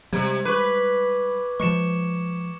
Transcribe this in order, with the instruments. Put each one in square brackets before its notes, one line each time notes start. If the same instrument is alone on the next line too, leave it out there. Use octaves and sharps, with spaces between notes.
[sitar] C3 [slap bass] G3 G#3 [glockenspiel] G#6
[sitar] B4 [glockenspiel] C#6 D6
[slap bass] F3 G#3 [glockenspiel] C#6 C#7 E7